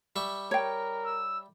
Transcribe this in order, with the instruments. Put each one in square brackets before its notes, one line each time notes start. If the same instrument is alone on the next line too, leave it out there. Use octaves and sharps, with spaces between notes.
[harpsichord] G3 E5 C#6
[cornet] A#4 [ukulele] C#5 G5
[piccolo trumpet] E6